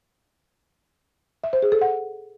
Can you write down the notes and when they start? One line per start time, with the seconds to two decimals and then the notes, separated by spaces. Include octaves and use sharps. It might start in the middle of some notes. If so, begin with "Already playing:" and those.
1.44 E5
1.53 C5
1.63 G#4
1.72 A4
1.81 F#5